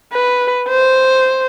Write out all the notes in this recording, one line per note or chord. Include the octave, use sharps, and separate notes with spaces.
B4
C5